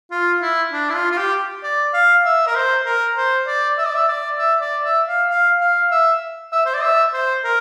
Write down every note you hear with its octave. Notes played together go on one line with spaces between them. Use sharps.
F4
E4
D4
E4
F4
F4
G4
D5
F5
E5
A#4
C5
A#4
C5
D5
E5
D5
E5
D5
E5
D5
E5
F5
F5
F5
E5
E5
C5
D5
E5
C5
A#4